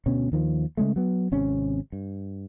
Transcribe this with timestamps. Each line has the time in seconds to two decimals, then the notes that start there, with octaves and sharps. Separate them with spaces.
0.06 D2 B2 C#4
0.32 D#2 D#3 F3
0.77 C#3 G#3 A3
0.96 F#3 B3
1.32 G#1 C3 C#4
1.92 G2